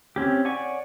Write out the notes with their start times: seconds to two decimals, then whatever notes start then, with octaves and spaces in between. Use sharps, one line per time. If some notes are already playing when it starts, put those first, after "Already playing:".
0.16 C4 C#4 G4
0.45 C#5 D5 F#5 G#5 C#6